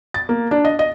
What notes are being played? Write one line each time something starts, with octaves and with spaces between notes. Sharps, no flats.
A6
A#3
D4
D#5
D#5